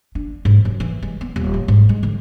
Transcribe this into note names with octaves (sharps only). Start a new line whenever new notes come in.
D4
G#2
F#2
E3
G#3
B3
D#1
A1
G#2
G#3
D3